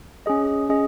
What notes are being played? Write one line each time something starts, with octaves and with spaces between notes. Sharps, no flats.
C#4 G#4 D#5
C#4 G#4 D#5